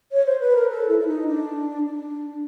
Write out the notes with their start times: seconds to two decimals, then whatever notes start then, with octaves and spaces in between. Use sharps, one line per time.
0.12 C#5
0.26 C5
0.40 B4
0.55 A#4
0.69 A4
0.89 E4
0.99 E4
1.07 D#4
1.27 D4
1.85 D4